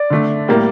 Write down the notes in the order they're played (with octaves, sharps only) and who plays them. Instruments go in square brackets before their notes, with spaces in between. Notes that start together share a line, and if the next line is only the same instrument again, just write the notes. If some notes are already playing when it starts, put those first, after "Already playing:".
Already playing: [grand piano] D5
[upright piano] D3 A3 D4
A2 G3 A#3